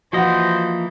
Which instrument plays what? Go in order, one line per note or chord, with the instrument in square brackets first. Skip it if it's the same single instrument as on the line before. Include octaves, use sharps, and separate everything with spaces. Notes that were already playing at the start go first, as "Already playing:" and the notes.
[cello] E3 [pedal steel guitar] F3 A#3 D#5 [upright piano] F#4 F#5 [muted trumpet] C5